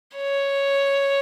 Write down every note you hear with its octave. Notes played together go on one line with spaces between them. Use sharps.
C#5